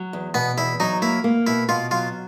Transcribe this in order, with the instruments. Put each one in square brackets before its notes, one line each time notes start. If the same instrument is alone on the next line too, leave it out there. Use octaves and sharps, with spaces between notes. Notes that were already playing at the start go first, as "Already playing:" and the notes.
Already playing: [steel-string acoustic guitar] F#3
E2
[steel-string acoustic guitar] B2 [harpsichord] B3
[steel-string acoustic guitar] E2 [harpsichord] E4
[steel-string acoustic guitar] F#3 [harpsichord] D#4
[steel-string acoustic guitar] A#3 [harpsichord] E4
[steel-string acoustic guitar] A#3
[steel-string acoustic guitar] B2 [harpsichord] E4
[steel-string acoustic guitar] B2 [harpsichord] F4
[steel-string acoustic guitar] F#3 [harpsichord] F4